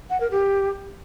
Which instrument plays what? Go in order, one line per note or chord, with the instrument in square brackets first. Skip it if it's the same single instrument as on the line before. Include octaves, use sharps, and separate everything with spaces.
[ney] F#5
A#4
G4